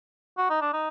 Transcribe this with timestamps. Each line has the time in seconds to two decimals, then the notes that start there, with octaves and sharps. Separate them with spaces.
0.38 F#4
0.50 D#4
0.61 D4
0.73 D#4